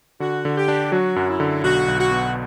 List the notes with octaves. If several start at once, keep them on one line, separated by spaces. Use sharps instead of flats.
D3 F#4
D3
G4
D4
F#3 F#4
F#2
E4
D3
B1 F#4
B1
F#4
B2